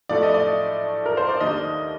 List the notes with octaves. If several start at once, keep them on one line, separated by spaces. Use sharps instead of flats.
A2 F3 A3 D5
D#5
D5
A#4
C5
D5
D#2 D#3 A#3 D4 D#5